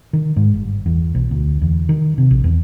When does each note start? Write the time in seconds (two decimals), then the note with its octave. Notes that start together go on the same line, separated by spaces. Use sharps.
0.13 D#3
0.36 G#2
0.54 G1
0.86 E2
1.15 B1
1.31 D2
1.62 E2
1.89 D#3
2.18 C3
2.31 A#1
2.44 E2